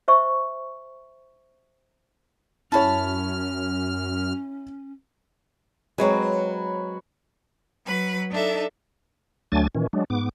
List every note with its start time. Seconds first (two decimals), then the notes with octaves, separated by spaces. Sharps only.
0.08 C5 E5 C#6
2.72 F#2 C#4 E4 C#5 A5 B5 F6
5.98 F#3 G#3 C4 B4 C#5 A#5
7.86 F#3 B4 B5
8.30 D4 D#4 A4 E5
9.52 D2 F#3 A3 D4 G#5 A6
9.75 A#2 D#3 E3 C#4
9.93 F#3 G#3 D4
10.10 G#2 B3 D6